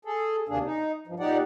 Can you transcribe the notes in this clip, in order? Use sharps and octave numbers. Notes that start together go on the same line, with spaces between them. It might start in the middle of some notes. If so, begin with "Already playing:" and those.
G#4 A4
D#2 C3 A#3 D4 G#4
D#4
G2 F3
A#2 D#4 G4 D5 F#5